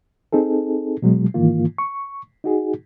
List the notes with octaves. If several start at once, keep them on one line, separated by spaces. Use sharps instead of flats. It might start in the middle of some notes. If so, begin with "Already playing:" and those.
C4 D#4 G#4 A4
B2 F#3 G#3
G#2 D#3 E3 A#3 F4
C#6
D#4 F#4 G#4